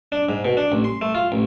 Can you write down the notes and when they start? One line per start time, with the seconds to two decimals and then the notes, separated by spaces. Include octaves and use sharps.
0.12 D4
0.29 G#2
0.45 B2
0.57 D4
0.72 A1
0.84 C6
1.01 A3
1.15 F4
1.32 A1